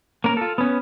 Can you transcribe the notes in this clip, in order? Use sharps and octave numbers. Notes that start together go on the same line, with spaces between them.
A#3 C#4 A#4
F4 A4
B3 C#4